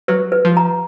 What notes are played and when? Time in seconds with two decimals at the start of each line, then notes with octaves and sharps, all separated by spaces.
0.08 F#3 B4
0.32 B4
0.45 F3
0.57 A#5